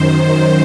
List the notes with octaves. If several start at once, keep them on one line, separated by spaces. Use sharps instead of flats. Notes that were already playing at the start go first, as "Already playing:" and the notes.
Already playing: F#2 D#3 C5